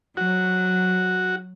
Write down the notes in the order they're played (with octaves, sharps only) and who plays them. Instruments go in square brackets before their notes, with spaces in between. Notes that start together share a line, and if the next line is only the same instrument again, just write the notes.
[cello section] F#3 [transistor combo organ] F#4